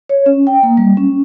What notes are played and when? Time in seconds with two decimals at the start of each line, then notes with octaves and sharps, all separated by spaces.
0.09 C#5
0.26 C#4
0.47 G5
0.63 A#3
0.77 G3
0.97 C#4